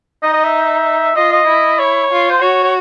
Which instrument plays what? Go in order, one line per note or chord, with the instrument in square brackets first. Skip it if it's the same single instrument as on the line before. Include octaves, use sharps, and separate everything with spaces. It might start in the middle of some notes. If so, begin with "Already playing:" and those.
[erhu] D#4 [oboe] D#5
[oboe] D#5
E5
[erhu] F4 [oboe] D#5
[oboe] D#5
[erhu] E4
[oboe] C#5
[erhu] F4
[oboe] C5
[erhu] F#4 [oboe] C#5
[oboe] C#5